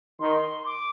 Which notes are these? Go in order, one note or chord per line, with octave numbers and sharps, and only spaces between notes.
D#3 C6
D6